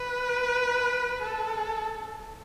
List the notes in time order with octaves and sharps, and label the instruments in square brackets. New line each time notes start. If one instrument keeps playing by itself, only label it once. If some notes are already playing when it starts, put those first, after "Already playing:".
Already playing: [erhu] B4
A4